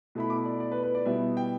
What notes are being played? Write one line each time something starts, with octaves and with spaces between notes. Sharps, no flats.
B2 A3 E4 B5
D6
D5
D5
B4
B4
D5
B2 G3 B3 E4 E5
G5